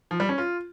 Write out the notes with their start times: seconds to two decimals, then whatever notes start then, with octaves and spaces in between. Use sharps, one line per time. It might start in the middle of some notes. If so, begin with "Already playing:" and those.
0.11 F3
0.20 G3
0.29 C#4
0.38 F4